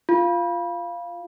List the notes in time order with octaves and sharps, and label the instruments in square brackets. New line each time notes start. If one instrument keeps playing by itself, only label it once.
[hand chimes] F4